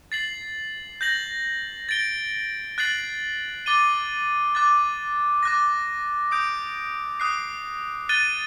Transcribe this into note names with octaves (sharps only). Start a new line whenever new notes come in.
A6 C7 F#7
G6 A#6 F#7
A6 D7 G7
F#6 A6 C7 F#7
D6 A6 D#7 G7
D6 F#6 A6
D6 F#6 A#6
D#6 G6 D7
D#6 F#6 C7
F#6 A6 D#7 G7